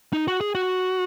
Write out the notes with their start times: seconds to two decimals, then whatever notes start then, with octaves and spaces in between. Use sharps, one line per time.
0.13 D#4
0.28 F#4
0.41 G#4
0.55 F#4